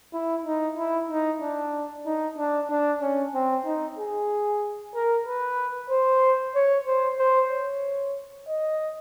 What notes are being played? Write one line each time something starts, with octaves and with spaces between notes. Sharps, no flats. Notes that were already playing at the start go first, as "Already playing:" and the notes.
E4
D#4
E4
D#4
D4
D#4
D4
D4
C#4
C4
D#4
G#4
A#4
B4
C5
C#5
C5
C5
C#5
D#5